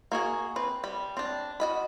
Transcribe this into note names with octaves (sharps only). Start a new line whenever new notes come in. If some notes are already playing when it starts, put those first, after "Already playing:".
A#3 F#4 G#4
C4 B4
G3 B5
C4 D4
F#4 D#5 B5